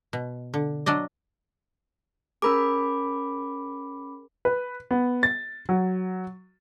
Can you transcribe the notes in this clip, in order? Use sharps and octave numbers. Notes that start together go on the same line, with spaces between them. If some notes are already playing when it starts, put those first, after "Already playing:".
B2
D3
F#3 D4 D5 D#5
C#4 G#4 A#4 B5 D6 E6
B4
B3
A6
F#3